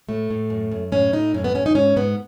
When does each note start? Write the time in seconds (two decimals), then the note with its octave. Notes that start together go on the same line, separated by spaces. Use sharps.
0.09 A2 A3
0.31 A2
0.50 F#2
0.72 F#2
0.92 A2 C#4
1.13 A2 D#4
1.34 F#2 C#4
1.44 B3
1.55 F#2 C#4
1.66 D#4
1.75 G#2 C#4
1.96 G#2 B3